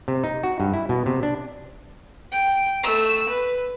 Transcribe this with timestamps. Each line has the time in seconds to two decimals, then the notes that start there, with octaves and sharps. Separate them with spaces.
0.08 C3
0.24 D#4
0.43 F#4
0.60 G2
0.74 E4
0.89 B2
1.06 C3
1.23 D4
2.32 G5
2.83 A3 E6
3.29 B4